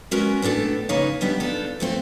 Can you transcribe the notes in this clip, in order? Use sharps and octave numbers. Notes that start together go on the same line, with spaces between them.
G#3 B3 C#4 F#4 A#4
A2 B3 D4 A4
C#3 A#3 D#4 B4 C#5 F5
D3 G3 B3 D4 D#4
B3 D4 D#4 F4 A4
D3 A3 C4 F4